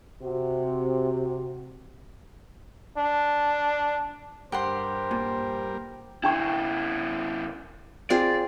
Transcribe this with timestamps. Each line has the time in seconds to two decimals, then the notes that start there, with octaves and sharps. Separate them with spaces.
0.22 C3 F#4
2.98 D4
4.52 G2 G3 G4 A#4 C5 F#5 C6
5.11 A#2
6.24 C#3 D4 E4 G5 C#6
8.10 C4 F4 G#4 D5